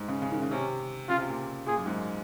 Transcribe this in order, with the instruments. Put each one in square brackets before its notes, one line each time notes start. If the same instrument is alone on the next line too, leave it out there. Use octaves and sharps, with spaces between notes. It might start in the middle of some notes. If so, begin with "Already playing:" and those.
Already playing: [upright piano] G#2
C#3
C#3
D#3
C#3
[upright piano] C3 [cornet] C#4
[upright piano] C#3 [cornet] F4
[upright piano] C3
A#2
[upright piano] A#2 [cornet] G#4
[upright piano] F#2
G#2